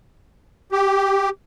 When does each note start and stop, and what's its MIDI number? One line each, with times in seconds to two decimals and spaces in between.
0.72 1.29 67